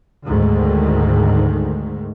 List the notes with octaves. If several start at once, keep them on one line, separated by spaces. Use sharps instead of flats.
D2 G#2 D#3